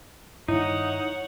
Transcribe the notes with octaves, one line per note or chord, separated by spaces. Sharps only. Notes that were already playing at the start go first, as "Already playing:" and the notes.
G2 D#3 D#4 E4 C#5 F#5